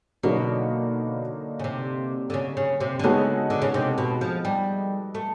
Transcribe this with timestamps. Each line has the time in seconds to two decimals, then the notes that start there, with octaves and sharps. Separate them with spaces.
0.23 B2 D3 F#3 A#3 D#4 F#4
1.59 C#3
1.64 C3
2.30 D3
2.34 C#3
2.57 C#3
2.80 C3
2.99 D3
3.04 C#3 G#3 B3 D#4 F#4 A4
3.50 D3
3.62 C#3
3.74 C3
3.98 B2
4.21 F3
4.45 G3
5.15 A3